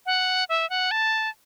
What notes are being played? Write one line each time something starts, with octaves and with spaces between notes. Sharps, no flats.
F#5
E5
F#5
A5